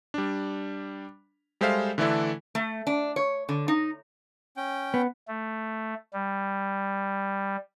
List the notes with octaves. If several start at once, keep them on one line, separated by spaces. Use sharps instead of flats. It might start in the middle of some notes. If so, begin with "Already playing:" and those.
G3 D4
G3 G#3 A4 C5 E5 F5
D3 E3 A3 D4 E4 A4
A3
D4
C#5
D3
D#4
C#4 G5
B3
A3
G3